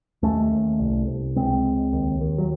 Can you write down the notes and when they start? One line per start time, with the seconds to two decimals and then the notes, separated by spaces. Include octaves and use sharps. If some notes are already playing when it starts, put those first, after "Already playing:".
0.23 D#2 A3 C#4
0.51 D#2
0.79 C2
1.07 C2
1.36 C#2 G#3 C4
1.63 C#2
1.93 D#2
2.20 D#2
2.38 F#3